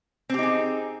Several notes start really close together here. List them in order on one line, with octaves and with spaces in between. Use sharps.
C4 G4 D#4 G#4